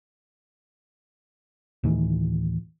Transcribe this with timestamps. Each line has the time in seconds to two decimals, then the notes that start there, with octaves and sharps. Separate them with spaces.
1.84 D2 A2 D#3 E3